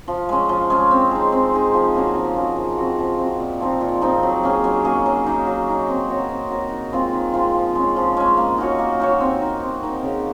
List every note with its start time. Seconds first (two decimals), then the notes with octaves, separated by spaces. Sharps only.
0.08 F3
0.29 G#3 C#4
0.49 F3
0.70 G#3 C#4
0.91 C4
1.11 D#4 G#4
1.32 C4
1.54 D#4 G#4
1.74 F3
1.95 A#3 C#4 F#4
2.15 F3
2.36 A#3 C#4 F#4
2.57 F3
2.77 C4 F#4
2.98 F3
3.19 C4 F#4
3.40 A#2
3.60 F3 C4 D#4
3.81 A#2
4.01 F3 C4 D#4
4.23 F#3
4.43 A#3 C#4 G#4
4.64 F#3
4.84 A#3 C#4 G#4
5.06 F#3
5.26 A#3 D#4
5.47 F#3
5.68 A#3 D#4
5.88 C4
6.09 F#4 A#4 C#5
6.30 C4
6.51 F#4 A#4 C#5
6.71 D#3
6.92 G#3 C4 F4
7.13 D#3
7.34 G#3 C4 F4
7.54 F3
7.75 G#3 C#4
7.96 F3
8.17 G#3 C#4
8.37 A#3
8.58 D#4 F#4 C#5
8.79 A#3
9.00 D#4 F#4 C#5
9.20 C4
9.42 D#4 A#4
9.61 C4
9.83 D#4 A#4
10.03 C#3